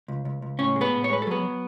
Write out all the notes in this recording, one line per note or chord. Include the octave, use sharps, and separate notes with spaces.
C#2
C#2
C#2
A2 C#4 C#5
G#3
B3 B4
A2
C#5
G#3 B4
A4
F#3 B3 B4
F#3